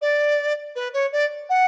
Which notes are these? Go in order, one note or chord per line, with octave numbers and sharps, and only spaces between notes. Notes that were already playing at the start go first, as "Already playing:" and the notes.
D5
B4
C#5
D5
F#5